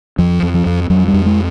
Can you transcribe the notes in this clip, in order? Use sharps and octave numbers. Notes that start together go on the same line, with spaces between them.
F2 F3
F2
F3
F2
F2 F#3
G3
F2
G#3